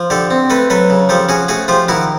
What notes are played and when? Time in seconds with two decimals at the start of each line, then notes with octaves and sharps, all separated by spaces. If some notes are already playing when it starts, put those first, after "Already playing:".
Already playing: F3
0.10 D3 G4 A4
0.30 C4
0.50 A3 A4 B4
0.70 F#3 A4 B4
0.90 C#3
1.09 F3 G4 A4
1.29 C#4 F#4 G#4
1.48 A3 F#4 G#4
1.68 F3 F4 G4
1.88 D#3 E4 F#4